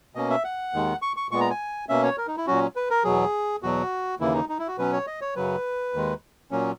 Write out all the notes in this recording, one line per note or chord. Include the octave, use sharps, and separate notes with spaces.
B2 A#3 C#4 D#5
E5
F#5
D#2 D#3 G#3
C#6
C#6
A#2 G#3 B3 C#6
A#5
G#5
B2 A#3 C#4 E5
C#5
A#4
D#4
E4
A#2 F#3 C#4 F#4
B4
A#4
E2 B2 F#3 G#4
E2 B2 F#3 F#4
D#2 C#3 E3 A#3 E4
D#4
D#4
E4
F#4
B2 F#3 C#4 B4
C#5
D#5
C#5
F#2 C#3 F#3 B4
D#2 D#3 G#3
A#2 F#3 A#3 C#4